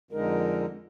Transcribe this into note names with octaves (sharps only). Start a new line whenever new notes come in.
F2 D3 G#3 D#4 A#4